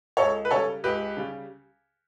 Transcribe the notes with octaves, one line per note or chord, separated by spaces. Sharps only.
C#2 A4 C#5
B4
C#3 G3 A4 C#5
C#2 G4 B4
C#3 G3